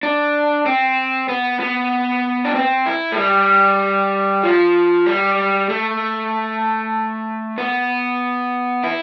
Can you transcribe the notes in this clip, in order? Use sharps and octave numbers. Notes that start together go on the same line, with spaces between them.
D4
C4
B3
B3
D4
C4
E4
A3
G3
F3
G3
A3
B3
E4